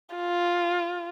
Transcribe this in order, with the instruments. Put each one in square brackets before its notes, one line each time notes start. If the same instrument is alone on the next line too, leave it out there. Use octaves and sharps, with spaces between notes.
[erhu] F4